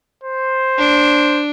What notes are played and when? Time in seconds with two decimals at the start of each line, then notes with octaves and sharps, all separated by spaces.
0.24 C5
0.78 D4